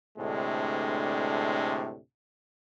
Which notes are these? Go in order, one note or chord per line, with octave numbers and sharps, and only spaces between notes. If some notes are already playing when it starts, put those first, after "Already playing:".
D2 A2 C3 G#3 D4